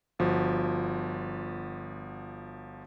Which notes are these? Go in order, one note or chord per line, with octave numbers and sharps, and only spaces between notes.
G1 F3 F#4